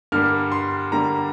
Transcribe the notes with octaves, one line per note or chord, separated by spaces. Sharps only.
G2 D3 G3 A#3 F6
C6
G2 D3 G3 A#3 A#5